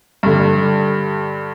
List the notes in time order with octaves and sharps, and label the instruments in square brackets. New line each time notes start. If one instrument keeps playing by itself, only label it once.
[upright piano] G2 D3